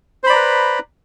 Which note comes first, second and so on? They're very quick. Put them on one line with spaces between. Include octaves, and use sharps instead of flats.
C5 B5 D5 A#5 B4